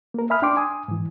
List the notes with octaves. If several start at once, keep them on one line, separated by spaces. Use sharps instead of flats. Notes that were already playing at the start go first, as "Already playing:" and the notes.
A#3 A#4
E5 G#5 B5 D#6 F6
D4 G5 C6 D6
G#5 D#6
G#2 E3